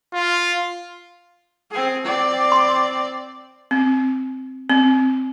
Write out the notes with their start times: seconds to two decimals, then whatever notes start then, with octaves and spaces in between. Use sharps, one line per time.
0.13 F4
1.71 C4 G#4
2.05 C4 D5
2.52 C6
3.71 C4
4.70 C4